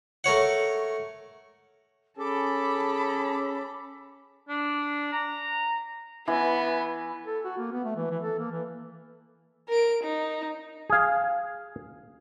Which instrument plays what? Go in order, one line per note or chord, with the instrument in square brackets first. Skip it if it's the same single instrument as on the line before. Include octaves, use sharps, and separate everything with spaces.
[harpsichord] A3 A#4 C#5 F#5
[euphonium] C#4 [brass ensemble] G#4 A4 [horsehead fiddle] A5 B5 [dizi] D6
[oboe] D4
A#5
[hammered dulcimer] E3 [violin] B3
[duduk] A4
F#4
A#3
B3
A3
E3
E3
A4
A#3
E3
[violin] A#4 D7
D#4
[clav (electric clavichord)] G#4 F5